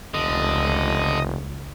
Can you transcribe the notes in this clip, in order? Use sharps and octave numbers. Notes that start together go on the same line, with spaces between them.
F1 C#2 D3 D#5 D#6